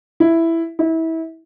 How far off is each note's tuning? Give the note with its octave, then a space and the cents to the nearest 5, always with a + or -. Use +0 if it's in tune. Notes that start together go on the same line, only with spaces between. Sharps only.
E4 +5
E4 -25